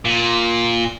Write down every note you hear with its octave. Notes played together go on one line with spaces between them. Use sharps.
A#2